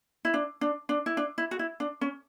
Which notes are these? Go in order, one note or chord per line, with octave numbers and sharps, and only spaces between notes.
E4
D4
D4
D4
E4
D4
E4
F#4
E4
D4
C#4